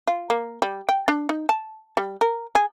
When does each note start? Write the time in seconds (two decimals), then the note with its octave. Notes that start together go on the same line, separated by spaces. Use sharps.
0.07 F4
0.30 A#3
0.62 G3
0.89 G5
1.08 D4
1.29 D#4
1.49 A5
1.97 G3
2.21 A#4
2.55 G#4